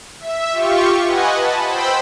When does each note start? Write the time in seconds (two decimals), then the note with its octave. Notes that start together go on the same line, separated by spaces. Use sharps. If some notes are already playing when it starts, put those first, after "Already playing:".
0.20 E5
0.52 F4 G4 C#6
1.06 B4 D#5 F#5 G#5
1.34 A5 B5
1.66 C5 G5 B5 E6